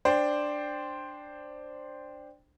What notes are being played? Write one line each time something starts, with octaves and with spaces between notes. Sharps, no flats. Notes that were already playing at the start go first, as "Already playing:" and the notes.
D4 C5 G5